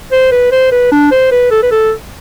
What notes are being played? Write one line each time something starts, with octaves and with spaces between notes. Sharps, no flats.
C5
B4
C5
B4
D4
C5
B4
A4
B4
A4